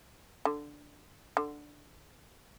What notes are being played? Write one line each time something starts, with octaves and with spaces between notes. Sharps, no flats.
D3
D3